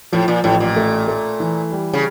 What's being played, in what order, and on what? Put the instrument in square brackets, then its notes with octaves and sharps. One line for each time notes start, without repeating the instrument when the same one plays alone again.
[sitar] A2 [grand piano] F3
[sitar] A#2
[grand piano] A1 [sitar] A2
[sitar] A#2
[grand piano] A3
A3
E3
G3
[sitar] C#3